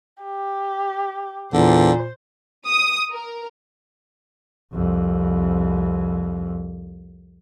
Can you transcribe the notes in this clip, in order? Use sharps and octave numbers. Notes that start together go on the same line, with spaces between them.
G4
E2 A#2 D3 C5
D#6
A#4
C2 F2